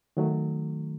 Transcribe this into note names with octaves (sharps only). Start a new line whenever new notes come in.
D#3 F#3 A3